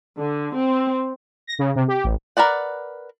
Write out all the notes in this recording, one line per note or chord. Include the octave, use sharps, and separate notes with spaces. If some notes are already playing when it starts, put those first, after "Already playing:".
D3
C4
A#6
C#3
C3
G4
A1
A#4 B4 D5 F#5